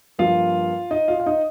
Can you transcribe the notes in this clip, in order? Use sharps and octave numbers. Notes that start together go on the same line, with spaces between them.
G2 F3 A#3 F4 F5
D#4 D#5
F4 F5
F5
D#4 D#5